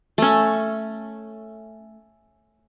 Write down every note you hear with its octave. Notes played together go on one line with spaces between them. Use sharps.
A3 C#4